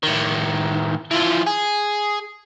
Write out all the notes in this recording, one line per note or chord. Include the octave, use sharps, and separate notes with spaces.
A2 D#3
E3 F3
G#4